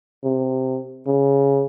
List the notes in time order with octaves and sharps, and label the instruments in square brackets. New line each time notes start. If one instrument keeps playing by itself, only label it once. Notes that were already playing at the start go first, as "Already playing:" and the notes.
[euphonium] C3
C#3